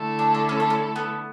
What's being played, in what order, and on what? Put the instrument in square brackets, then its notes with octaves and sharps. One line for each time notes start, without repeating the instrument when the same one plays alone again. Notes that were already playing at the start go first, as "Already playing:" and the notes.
Already playing: [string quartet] D3 A3 E4 A4
[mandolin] D4
D4
C#4
D4
C#4
B3